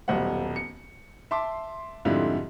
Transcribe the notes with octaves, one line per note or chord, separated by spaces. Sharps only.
D#1 B1 G3 C5 F#5
C#7
E5 A5 C6 D6
F2 G#2 D3 G3 E4 F4